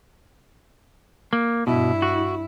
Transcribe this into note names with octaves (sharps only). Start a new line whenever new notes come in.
A#3
G2 B2 E4
F#4